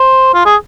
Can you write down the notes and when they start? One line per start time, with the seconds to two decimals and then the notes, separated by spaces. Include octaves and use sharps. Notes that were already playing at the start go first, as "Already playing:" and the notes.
Already playing: C5
0.34 F4
0.45 G#4